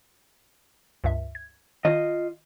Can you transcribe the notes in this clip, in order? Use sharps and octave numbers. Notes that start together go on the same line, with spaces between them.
C#2 G2 E5
G#6
D#3 F4 D#5